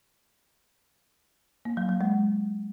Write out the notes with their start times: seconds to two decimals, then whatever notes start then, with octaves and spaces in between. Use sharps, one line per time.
1.65 A#3
1.77 F#3
1.89 F#3
2.01 G#3